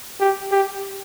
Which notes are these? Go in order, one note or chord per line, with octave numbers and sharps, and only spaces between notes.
G4
G4